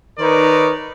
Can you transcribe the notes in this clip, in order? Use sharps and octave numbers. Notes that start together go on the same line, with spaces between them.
D#3 D#4 A#4 B4 C#5 D5